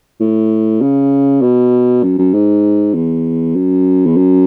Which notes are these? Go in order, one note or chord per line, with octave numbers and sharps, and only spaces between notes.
A2
C#3
B2
F#2
F#2
G#2
E2
F#2
E2
F#2